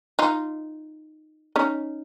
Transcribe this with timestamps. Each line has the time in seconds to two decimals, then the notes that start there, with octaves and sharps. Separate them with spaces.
0.19 D#4 F4
1.56 C#4 D#4